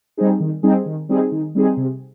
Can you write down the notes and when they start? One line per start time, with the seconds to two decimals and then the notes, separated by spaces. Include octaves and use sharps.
0.17 G3 C4 D#4 G#4
0.40 D#3
0.63 G3 C4 D#4 G#4
0.86 D#3
1.09 G3 C4 D#4 G#4
1.32 D#3
1.55 G3 C4 D#4 G#4
1.77 C3